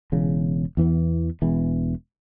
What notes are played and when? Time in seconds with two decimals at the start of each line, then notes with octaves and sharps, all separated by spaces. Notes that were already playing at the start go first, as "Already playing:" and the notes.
0.12 E1 E2 C#3
0.77 E2 E3 B3
1.42 E1 E2 E3